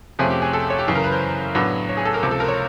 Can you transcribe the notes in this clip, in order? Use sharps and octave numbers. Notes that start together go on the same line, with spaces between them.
F2 C3 F3 A3 C#4 G#4
G4
G#4
A4
C#5
G4
F#2 C#3 E3
A#4
B4
C5
A2 F#3 B3 D4
C#5
G#4
A4
A#4
C#2 C3 F3
A4
A#4
C#5